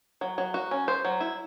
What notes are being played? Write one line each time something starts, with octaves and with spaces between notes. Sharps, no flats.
F#3
F#3
F#4
C#4
C5
F#3
E4